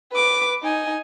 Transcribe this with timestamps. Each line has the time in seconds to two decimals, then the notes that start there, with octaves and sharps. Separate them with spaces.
0.12 B4 D6
0.63 D#4 G#5